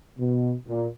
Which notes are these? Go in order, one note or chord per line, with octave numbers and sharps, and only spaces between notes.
B2
A#2